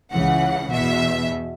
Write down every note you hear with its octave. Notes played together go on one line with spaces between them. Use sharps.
C#2 C#3 E3 F#5
E2 B2 E5